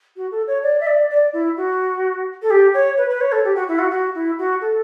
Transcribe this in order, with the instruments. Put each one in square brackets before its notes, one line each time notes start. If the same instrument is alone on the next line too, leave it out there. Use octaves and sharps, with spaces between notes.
[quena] F#4
A4
C#5
D5
E5
D5
D5
E4
F#4
A4
G4
C#5
B4
B4
C#5
A4
G4
F#4
E4
F#4
F#4
E4
F#4
A4